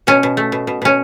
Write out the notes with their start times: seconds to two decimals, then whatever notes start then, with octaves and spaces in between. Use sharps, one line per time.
0.07 B2 C#4
0.23 B2
0.37 A3
0.52 B2
0.67 B2
0.82 B2 C#4